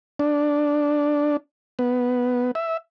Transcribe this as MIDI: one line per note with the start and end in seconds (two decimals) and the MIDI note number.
0.19 1.37 62
1.79 2.51 59
2.55 2.77 76